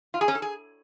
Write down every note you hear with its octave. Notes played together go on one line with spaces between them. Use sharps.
F4
G#4
C#4
A4
G#4